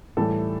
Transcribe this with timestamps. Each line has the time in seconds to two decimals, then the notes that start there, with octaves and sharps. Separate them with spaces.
0.17 A2 E3 G3 A4